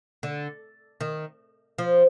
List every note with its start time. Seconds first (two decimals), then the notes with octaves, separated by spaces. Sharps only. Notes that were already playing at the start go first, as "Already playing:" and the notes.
0.23 D3
1.01 D#3
1.78 F3